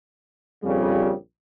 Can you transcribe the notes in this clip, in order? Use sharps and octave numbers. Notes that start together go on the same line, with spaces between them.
A#1 F2 C#3 G3